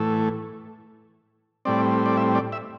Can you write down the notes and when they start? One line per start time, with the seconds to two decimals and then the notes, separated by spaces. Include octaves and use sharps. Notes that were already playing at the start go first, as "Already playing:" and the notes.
Already playing: A2 E3 A3
1.65 A2 G3 C4 D5
2.06 D5
2.17 E5
2.35 D5
2.52 E5